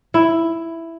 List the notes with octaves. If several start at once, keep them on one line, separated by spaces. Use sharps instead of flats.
E4